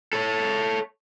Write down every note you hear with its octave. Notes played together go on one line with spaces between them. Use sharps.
A4 C#5